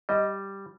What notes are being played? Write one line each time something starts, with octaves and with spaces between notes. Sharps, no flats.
G3 D#5